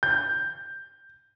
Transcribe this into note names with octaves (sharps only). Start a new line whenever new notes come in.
G6